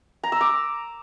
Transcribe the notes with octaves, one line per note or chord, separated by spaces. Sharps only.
A#5
E6
D6